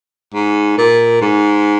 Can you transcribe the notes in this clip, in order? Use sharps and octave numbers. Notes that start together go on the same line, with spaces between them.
G#2
A#2
G#2